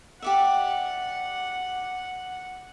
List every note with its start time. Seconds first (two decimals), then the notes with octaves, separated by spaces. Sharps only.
0.22 G4 D5 E5 F#5